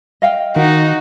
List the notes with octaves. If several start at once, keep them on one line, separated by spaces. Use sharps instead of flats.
D#5 F5 G5
D#3 D#4 F#4